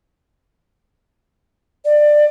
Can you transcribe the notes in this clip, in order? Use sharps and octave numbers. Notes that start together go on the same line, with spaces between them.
D5